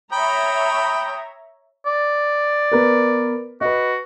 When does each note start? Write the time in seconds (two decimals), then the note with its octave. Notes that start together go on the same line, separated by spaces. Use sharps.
0.13 C#5 E5 G5 A#5 B5 D#6
1.86 D5
2.72 B3 A#4 B4
3.61 F#4 B4 D#5